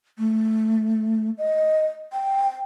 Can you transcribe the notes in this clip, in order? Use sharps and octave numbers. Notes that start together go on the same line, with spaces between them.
A3
D#5
G5